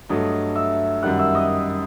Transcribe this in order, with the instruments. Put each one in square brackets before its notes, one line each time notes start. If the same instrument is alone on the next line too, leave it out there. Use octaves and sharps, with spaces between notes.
[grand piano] G2 F#3 A3 [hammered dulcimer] D#5
[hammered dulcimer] E5
[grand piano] F#2 D#3 G3 [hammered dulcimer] F#5
[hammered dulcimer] E5
D#5